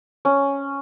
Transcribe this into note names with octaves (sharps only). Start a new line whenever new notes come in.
C#4